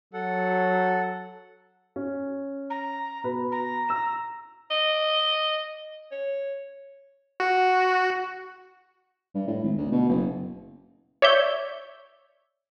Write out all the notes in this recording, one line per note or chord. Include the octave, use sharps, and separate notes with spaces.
F#3 A4 F#5
C#4
A#5
B2 B4
A#5
E6 E7
D#5
C#5
F#4
G2
A2
G#1
D2
B2
F#1
C#5 D5 E5 G6